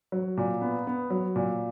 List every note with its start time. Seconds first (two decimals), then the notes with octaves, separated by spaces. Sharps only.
0.12 F#3
0.37 A#2
0.61 B3
0.87 B3
1.10 F#3
1.36 A#2